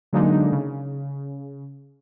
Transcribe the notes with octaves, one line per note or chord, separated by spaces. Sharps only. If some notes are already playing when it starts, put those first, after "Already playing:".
D3 F#3 G#3 A#3 D4 D#4
C#3